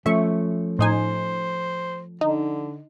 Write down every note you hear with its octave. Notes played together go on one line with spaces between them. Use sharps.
F3 A3 C#4 E5 C#6
A2 D#4 C5 G#5
D3 D#4